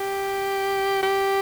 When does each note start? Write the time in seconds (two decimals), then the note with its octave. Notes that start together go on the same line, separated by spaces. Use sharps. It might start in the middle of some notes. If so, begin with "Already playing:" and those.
Already playing: G4
1.03 G4